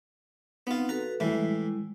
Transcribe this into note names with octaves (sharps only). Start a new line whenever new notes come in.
B3 C4 D#4 F4
F#4 A4 B4 A#5
A2 E3 G3 G#3 E4